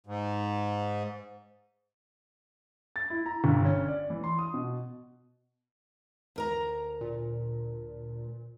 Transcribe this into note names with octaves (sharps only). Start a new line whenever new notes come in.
G#2
A6
E4
A#5
G1
C#4
D5
E3
C6
D#6
B2
D2 A#4 A#5
A#2